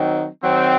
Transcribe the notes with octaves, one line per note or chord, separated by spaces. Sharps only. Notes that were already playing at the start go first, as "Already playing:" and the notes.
Already playing: D#3 F#3 C4 D#4
D#3 F#3 C4